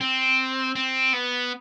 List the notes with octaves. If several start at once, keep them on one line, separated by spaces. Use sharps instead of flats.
C4
C4
B3